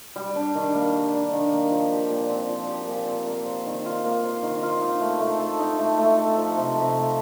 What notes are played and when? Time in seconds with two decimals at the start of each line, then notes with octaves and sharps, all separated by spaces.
0.16 G3
0.36 D4
0.55 D#3
0.75 A#3
0.94 G3
1.13 D4
1.32 D#3
1.53 A#3
1.71 F3
1.91 G4
2.10 A#2
2.29 C4
2.49 F3
2.68 G4
2.88 A#2
3.07 C4
3.27 A#3
3.46 C5
3.66 D#3
3.85 F4
4.05 A#3
4.24 C5
4.43 D#3
4.63 F4
4.82 D#4
5.01 A3
5.20 A3
5.40 A4
5.59 D#4
5.79 A3
5.98 A3
6.18 A4
6.37 F3
6.57 C3
6.76 C3
6.96 A3